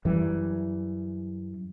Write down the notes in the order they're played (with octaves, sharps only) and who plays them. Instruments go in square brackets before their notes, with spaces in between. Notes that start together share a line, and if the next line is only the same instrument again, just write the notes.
[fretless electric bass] F#2 E3 G3